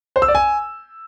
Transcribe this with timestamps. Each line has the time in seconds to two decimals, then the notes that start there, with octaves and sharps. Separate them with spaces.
0.16 C5
0.22 E6
0.28 D5
0.35 G#5